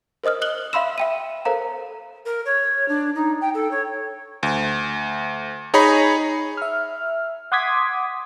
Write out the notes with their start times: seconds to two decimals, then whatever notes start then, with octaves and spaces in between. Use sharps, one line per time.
0.24 A#4 C5 D#5 D#6 F6
0.42 D#6 F#6 F#7 G7
0.73 E5 F5 B5 C6 E6 E7
0.98 E5 G5 D#7
1.45 A4 A#4 C5 F5 A#5
2.25 A#4
2.45 C#5
2.88 D4
3.15 D#4
3.41 G5
3.54 A4
3.71 C#5
4.43 D2
5.74 D#4 G#4 C#5 G#5 A#5 B5
6.57 E5 F6
7.52 F#5 C6 D6 D#6 G#6 B6